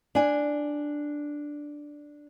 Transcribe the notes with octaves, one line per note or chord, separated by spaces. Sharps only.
D4 G#5